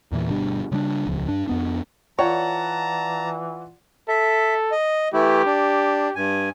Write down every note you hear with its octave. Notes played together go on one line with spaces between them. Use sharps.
E2 A#2 E3
G1 B2 G3 D4
C#3 G3 A#3 D4
D#1 C#2 F3
G2 D4
F2 B3 D4
E3 F4 C#5 D5 F#5 A5 A#5
A4 E5
D#5
E3 A3 E4 G4
D4
G2 G#5